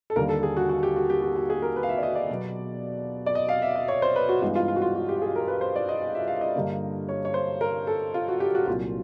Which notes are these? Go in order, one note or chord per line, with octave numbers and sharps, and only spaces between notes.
A4
D#2 D3 G3 A#3 A#4
A4
G#4
F#4
F#4
G4
F#4
G4
F#4
F#4
G#4
A#4
B4
F5
E5
D5
D#5
D5
B2 F#3 B3
D5
D#5
F5
E5
D#5
C#5
C5
B4
F#4
G2 E3 G#3 B3 F#4
F4
F4
F#4
F4
F#4
G4
G#4
A#4
B4
C5
D5
D#5
D#5
E5
F5
D#5
G2 D3 G3 A#3
C#5
C#5
C5
A#4
A4
F4
F#4
G4
F#4
C2 A#2 F#3 F4